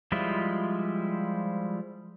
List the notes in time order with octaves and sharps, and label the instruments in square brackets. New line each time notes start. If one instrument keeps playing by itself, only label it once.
[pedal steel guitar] F3 G3 G#3 E4 F4